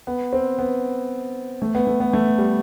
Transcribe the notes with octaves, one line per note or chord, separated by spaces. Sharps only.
B3
C4
B3
A3
B3
A3
B3
A3
G3